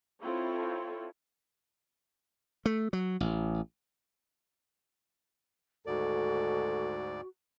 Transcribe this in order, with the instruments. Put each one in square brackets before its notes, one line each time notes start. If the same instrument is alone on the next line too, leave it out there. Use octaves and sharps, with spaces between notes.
[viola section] C4 E4 F4 A4 C#5
[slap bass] A3
F#3
A1
[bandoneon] D2 G#2 D5 [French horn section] D#3 G#3 A4 [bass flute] F#4